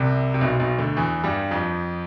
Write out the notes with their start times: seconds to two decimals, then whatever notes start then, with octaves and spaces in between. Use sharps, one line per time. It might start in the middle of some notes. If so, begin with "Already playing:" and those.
Already playing: C2 C3
0.34 C3
0.41 B1 B2
0.60 B1 B2
0.79 D2 D3
0.97 E2 E3
1.24 G2 G3
1.51 F2 F3